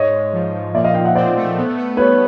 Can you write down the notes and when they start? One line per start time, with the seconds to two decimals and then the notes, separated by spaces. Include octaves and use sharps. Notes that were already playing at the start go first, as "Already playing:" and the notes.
Already playing: G#2 C#5 D#5
0.12 G#2
0.33 F3
0.53 F3
0.74 A#2 D5 E5
0.84 D#5 F5
0.94 A#2 F5 G5
1.05 E5 F#5
1.15 C4 C5 D5
1.36 A3
1.57 B3
1.77 B3
1.97 G3 B4 C#5